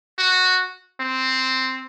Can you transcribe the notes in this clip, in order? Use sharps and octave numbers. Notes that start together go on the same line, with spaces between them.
F#4
C4